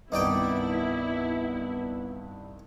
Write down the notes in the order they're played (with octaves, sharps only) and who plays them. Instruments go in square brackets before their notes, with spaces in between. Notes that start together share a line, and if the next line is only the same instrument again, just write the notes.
[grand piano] C2 G2 [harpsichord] D#3 D5 G5 [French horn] B3 [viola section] E4